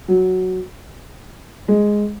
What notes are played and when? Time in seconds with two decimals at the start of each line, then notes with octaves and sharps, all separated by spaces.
0.08 F#3
1.68 G#3